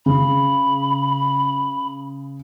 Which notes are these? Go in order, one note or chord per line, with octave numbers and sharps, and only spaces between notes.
C#3 B5